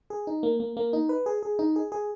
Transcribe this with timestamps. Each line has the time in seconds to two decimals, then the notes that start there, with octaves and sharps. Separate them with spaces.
0.10 G#4
0.27 D#4
0.43 A#3
0.60 A#3
0.77 A#3
0.93 D#4
1.09 B4
1.26 G#4
1.43 G#4
1.59 D#4
1.76 G#4
1.92 G#4